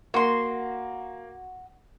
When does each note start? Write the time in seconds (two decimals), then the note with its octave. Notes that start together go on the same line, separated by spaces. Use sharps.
0.14 A#3 F#4 C6